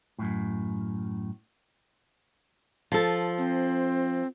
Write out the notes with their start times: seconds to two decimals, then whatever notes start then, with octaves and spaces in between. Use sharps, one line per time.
0.19 F#2 A2
2.92 F3 A4
3.38 C4